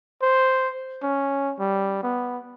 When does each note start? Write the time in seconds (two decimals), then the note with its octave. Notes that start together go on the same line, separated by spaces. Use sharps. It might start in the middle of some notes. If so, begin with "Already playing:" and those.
0.22 C5
1.03 C#4
1.59 G3
2.03 B3